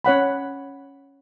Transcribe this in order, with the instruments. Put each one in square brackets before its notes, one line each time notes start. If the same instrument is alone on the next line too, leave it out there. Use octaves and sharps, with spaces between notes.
[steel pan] C#4 C#5 F#5 B5